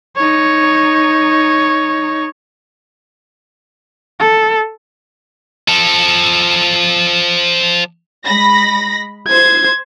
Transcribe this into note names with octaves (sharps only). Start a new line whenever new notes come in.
D#4 C#5
A4
F3 A4
G#3 B5 A#6
C5 G#6